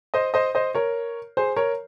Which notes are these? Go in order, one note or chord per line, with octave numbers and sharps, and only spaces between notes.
C5 D#5
C5 D#5
C5 D#5
A#4 C#5
G#4 C5
A#4 C#5